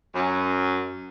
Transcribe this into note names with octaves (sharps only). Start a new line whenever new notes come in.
F#2